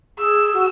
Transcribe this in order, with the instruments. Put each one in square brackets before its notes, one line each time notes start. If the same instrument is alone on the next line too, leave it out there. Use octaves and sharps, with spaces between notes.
[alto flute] G#4 [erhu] E6
[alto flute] F#4